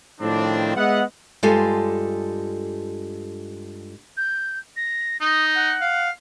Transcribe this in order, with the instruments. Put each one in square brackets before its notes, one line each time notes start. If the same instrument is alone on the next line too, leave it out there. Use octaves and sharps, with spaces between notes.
[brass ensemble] A2 D#3 F3 G3 C4 D4
G#3 B3 D#5 E5 F#5
[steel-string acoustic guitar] G2 G#3 F4 G4 A4 G#5
[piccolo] G6
A#6
[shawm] D#4 [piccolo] D#6
[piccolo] F#5
[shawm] F5